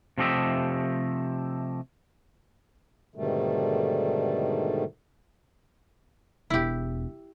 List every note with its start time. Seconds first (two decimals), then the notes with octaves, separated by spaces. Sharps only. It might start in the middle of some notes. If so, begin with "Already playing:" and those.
0.18 C3 F3 A3 G4 D#5 E5
3.15 G#2 B2 D3 D#3 G3 A3
6.50 E1 E4 G4